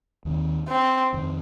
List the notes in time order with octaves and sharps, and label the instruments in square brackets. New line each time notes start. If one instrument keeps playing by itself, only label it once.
[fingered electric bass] D#2 D#3 C4
[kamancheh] C4
[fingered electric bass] F2 D#3 C4